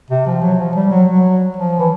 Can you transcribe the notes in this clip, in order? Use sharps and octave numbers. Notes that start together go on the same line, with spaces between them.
C3
F3
F#3
F3
G3
F#3
F#3
F3
E3